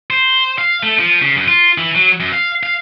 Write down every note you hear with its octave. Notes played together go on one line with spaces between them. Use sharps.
C5
F5
A3
F3
C#3
F#2
F4
E3
F#3
F#2
F5
F5